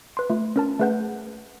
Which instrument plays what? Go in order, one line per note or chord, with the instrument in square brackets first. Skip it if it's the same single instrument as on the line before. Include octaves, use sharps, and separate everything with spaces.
[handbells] B4 C6
A3 F4
C#4 A#4 A5
A3 G#4 B4 F#5 G6